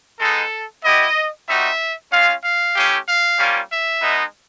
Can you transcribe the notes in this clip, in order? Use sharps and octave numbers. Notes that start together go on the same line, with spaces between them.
G#3 B3 D#4 A4
B3 E4 G4 D#5
G3 C4 D#4 F#4 E5
G#3 C#4 F4 F5
F5
A3 C#4 E4 G4
F5
G3 A#3 C#4 F4
E5
G#3 B3 D#4